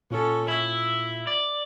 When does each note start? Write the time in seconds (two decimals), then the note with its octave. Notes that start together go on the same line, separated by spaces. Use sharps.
0.11 A#2 C#4 F4 A4
0.48 E4 E5
1.27 D5